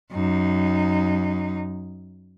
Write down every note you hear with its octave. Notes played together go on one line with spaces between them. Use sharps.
F#2 D#4